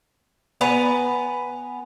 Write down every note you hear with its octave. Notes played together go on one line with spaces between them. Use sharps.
B3 B4 G#5 A#5